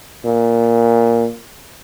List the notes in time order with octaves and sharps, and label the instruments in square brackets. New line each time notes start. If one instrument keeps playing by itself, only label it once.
[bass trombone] A#2